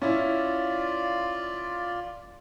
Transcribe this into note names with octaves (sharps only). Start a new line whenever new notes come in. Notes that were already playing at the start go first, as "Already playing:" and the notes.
C#4 E4 F4 D5